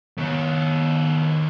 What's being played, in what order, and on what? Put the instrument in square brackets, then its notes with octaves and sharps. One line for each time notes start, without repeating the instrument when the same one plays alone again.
[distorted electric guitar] D#3 C#5